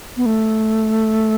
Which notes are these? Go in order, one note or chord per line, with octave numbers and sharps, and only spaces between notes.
B3
A3